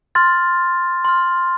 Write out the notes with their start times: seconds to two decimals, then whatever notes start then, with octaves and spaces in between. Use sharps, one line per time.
0.15 C6 F6 A6
1.05 C6 F6